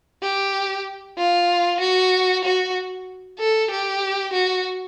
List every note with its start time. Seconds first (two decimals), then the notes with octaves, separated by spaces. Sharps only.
0.22 G4
1.18 F4
1.80 F#4
2.45 F#4
3.39 A4
3.71 G4
4.33 F#4